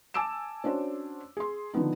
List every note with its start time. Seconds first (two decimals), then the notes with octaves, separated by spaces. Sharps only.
0.14 G#5 A5 D6 E6 D7 E7
0.64 C#4 D4 F#4 C5
1.37 G#4 C6
1.74 D3 D#3 F3 B3 D#4